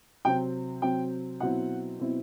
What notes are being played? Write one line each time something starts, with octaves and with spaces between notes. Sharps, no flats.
C3 F#3 C4 G5
C3 F#3 C4 G5
B2 F#3 C4 E4 F#5
B2 F#3 C4 E4